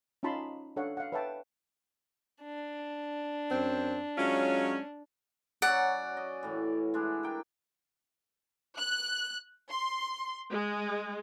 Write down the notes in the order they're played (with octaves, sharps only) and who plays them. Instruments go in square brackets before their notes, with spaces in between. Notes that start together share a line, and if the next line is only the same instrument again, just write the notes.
[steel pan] C#4 D#4 F4 A5 B5 C6
D4 A4 C#5 F5 F#5
F5 F#5
B4 C#5 E5 F#5 G5 A5
[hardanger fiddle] D4
[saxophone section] F#2 C4
[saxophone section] F#3 G#3 F4 [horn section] C#4
[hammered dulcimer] F#3 C#4 F#4 [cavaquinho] D5 F#5
[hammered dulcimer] D#5
A2 E3
G#3 D4 E4
A#4 G5
[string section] F#6
C6
G#3